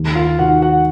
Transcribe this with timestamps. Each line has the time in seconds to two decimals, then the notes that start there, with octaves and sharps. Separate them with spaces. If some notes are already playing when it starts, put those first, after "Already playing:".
Already playing: D#2
0.15 F4 F5
0.39 D#3 F#4 F#5
0.62 F#4 F#5